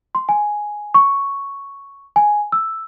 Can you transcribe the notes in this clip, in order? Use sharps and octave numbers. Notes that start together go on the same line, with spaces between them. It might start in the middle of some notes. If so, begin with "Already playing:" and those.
C6
G#5
C#6
G#5
E6